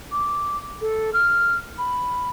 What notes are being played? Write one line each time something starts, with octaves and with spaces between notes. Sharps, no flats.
D6
A4
F6
B5